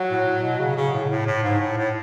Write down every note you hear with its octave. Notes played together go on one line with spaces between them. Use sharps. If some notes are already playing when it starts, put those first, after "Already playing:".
Already playing: F#3
A2
A2
B2
C#3
C#3
A2
A2
A2
G#2
A2
A2